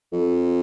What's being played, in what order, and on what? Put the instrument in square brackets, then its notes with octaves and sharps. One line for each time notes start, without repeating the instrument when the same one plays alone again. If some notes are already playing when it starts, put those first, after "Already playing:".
[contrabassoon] F2